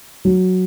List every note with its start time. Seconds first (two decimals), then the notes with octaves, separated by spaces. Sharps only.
0.25 F#3